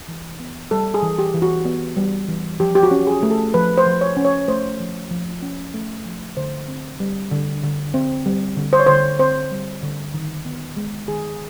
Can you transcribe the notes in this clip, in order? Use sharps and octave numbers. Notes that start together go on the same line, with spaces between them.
E3
B3
G3 A4
G#4
E3
G4
E3
F#4
B3
G3
E3
F3 G4
G4
F#4
C#4
G#4
A3
A4
F3 B4
C5
F3
C#5
C#4
C#5
A3 C5
F3
F3
C#4
A3
F3
D3 C5
C4
G3
D3
D3
C4
G3
D3
C5
C#5
D3 C5
C4 C5
G3
D3
D#3
B3
G#3
D#3 G#4